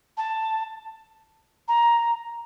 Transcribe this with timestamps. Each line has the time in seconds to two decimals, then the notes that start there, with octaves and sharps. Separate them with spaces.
0.17 A5
1.68 A#5